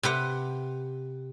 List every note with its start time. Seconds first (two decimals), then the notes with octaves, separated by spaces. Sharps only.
0.03 C3 G4 B4 F#5